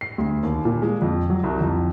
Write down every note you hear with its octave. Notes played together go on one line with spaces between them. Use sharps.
C7
D2
D#2
A#2
G#3
F2
F#3
C2
F2